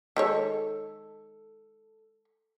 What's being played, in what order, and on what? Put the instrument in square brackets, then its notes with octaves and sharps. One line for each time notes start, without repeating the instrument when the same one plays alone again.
[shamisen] D#3 G#3 C#5 [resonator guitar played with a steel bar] A4